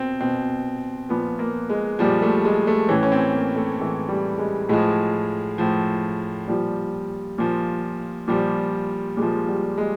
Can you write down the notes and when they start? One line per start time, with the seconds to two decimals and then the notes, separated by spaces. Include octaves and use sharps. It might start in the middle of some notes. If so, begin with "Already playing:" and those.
Already playing: B2 C4
0.21 B2 C4
1.09 A#2 F3 B3
1.39 A#3
1.70 G#3
1.99 A#2 F3 G3
2.22 A3
2.45 G#3
2.67 A3
2.89 A2 E3 C#4
3.03 C#4
3.12 C4
3.34 A#3
3.56 A3
3.79 A2 E3 G#3
4.08 G3
4.38 G#3
4.69 A2 F3 G#3
5.58 A2 F3
6.48 A#2 F3 G3
7.38 A#2 F3
8.28 A#2 F3 G3
9.17 A#2 F3 G#3
9.48 G3
9.78 G#3